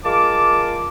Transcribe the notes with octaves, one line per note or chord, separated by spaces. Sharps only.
G#3 F4 A#4 A5 D6